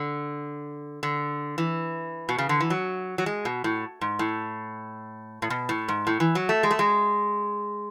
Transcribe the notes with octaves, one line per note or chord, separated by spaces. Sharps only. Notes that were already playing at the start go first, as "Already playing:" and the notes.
Already playing: D3
D3
E3
B2
C#3
D3
E3
F#3
F#3
G#3
B2
A2
G#2
A2
A2
B2
A2
G#2
A2
E3
F#3
A3
G#3
A3
G#3